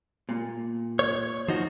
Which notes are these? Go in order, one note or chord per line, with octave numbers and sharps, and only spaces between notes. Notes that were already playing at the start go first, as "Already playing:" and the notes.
A#2
C#5
F3 D#4 F#4